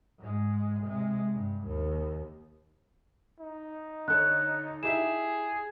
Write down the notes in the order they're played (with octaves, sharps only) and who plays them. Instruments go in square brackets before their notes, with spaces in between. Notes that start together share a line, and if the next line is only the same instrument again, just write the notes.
[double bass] G#2 G#3
C3 G#3
G2
D#2
[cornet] D#4
[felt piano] D3 A4 C#5 [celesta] F#6
[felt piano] E4 G4 E5 [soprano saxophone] G#4 [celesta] E7